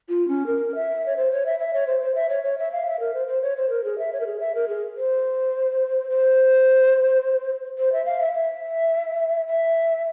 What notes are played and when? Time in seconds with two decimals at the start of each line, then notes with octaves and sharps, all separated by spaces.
0.09 F4
0.28 C#4
0.46 A#4
0.75 E5
1.06 C#5
1.16 C5
1.31 C#5
1.46 E5
1.59 E5
1.73 C#5
1.87 C5
2.01 C5
2.15 E5
2.29 C#5
2.43 C#5
2.58 E5
2.72 F5
2.86 E5
2.99 A#4
3.14 C5
3.27 C5
3.42 C#5
3.56 C5
3.69 A#4
3.84 G#4
3.98 E5
4.13 C#5
4.20 A#4
4.26 G#4
4.40 E5
4.55 A#4
4.68 G#4
4.97 C5
6.09 C5
7.78 C5
7.92 E5
8.05 F5
8.20 E5
8.34 E5
9.47 E5